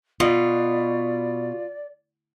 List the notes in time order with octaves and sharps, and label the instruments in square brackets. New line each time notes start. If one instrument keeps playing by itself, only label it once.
[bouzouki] B2 [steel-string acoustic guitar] F4 [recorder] D5